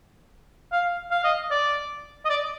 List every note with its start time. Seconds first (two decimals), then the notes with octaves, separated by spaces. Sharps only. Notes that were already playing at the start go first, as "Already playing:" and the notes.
0.72 F5
1.11 F5
1.24 D#5
1.51 D5
2.25 D#5
2.29 D5